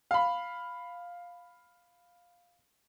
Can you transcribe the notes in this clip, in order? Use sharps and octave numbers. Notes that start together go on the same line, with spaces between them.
F5 B5